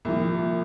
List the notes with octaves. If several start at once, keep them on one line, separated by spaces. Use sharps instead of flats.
C2 A#2 F3